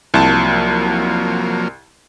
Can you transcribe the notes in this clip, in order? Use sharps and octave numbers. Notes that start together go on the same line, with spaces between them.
C2 F3 F#3 A#3 A5